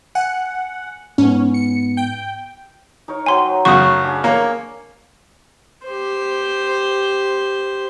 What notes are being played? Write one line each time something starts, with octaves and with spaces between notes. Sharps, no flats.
F#5 G#5
G#2 B3 C#4
C#7
G5
D#4 A#4 C#5
F#3 C5 G5 G#5 C6
F#2 C#3 A3 F#4 A#4 C#6 D#6
D4 G#4
A#3 C#5
G4 C5